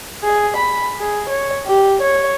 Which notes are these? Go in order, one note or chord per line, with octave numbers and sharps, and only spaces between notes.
G#4
B5
G#4
C#5
G4
C#5